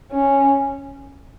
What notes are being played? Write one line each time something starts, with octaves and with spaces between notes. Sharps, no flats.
C#4